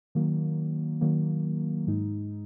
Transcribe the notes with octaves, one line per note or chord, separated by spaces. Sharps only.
D#3 F#3 A#3
D#3 F#3 A#3
G#2 G#3 D#4